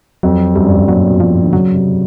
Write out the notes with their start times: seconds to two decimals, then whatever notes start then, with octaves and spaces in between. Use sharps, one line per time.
0.23 F2 F#3
0.56 F#2 G3
0.66 G2
0.77 F#2
0.88 A#2 F#3
1.10 B2
1.20 F3
1.43 D3
1.53 C#3 F#3
1.74 C3